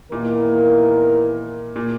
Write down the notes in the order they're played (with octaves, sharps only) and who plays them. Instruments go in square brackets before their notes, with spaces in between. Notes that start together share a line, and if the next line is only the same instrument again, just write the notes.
[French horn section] E2 D#3 A#3 E4 A#4 [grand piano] A#2
[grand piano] A#2